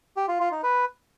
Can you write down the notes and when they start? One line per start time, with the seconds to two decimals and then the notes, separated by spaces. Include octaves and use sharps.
0.17 G4
0.28 F4
0.40 F4
0.51 D#4
0.63 B4